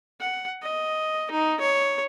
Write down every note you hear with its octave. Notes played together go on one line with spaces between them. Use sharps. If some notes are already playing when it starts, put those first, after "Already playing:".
F#5
D#5
D#4
C#5